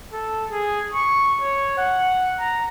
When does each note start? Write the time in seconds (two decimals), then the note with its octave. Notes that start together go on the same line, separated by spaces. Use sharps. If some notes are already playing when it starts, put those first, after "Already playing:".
0.13 A4
0.51 G#4
0.94 C#6
1.41 C#5
1.78 F#5
2.40 A#5